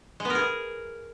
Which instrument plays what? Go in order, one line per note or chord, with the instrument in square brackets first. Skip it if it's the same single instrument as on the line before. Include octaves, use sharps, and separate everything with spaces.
[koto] G#3
B3
A#4
G#4